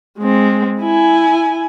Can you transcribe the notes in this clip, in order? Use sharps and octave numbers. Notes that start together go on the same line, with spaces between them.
G#3 C4
E4 G#5